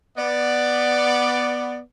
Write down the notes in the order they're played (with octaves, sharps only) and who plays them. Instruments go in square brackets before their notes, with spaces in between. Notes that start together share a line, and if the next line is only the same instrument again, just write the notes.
[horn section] B3 D5